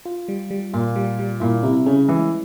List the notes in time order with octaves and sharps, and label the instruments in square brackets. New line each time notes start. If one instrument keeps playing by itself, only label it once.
[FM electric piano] F4
G3
G3
[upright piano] A#2 [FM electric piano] F4
[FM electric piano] G3
G3
[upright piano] A#2 [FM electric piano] E4
[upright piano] C3 [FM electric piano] E4
[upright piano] C#3 [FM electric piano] C#4
[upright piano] E3 [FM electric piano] G#3